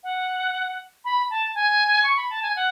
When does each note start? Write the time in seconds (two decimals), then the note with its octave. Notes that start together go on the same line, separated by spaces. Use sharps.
0.03 F#5
1.05 B5
1.30 A5
1.55 G#5
2.03 C#6
2.17 B5
2.30 A5
2.42 G#5
2.56 F#5